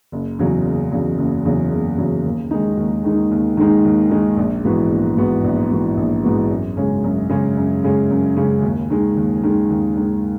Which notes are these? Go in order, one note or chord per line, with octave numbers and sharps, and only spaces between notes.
F#1
E2 C#3 F#3
F#1
E2 C#3 F#3
F#1
E2 C#3 F#3
F#1
E2 C#3 F#3
D#2
D#3 G#3 D#4
D#2
D#3 G#3 D#4
D#2
D#3 G#3 D#4
D#2
D#3 G#3 D#4
A#1
G#2 E3 B3 F#4
A#1
G#2 E3 B3 F#4
A#1
G#2 E3 B3 F#4
A#1
G#2 E3 B3 F#4
F#2
C#3 G#3 C#4
F#2
C#3 G#3 C#4
F#2
C#3 G#3 C#4
F#2
C#3 G#3 C#4
D#2
D#3 G#3
D#2
D#3 G#3
D#2
D#3 G#3